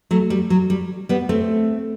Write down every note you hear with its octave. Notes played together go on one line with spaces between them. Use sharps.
F#3 A3
G3
F#3
G3
G3 B3
A3 C4